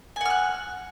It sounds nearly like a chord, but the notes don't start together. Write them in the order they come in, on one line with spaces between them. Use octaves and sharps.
G#5 F#5 F6 F#6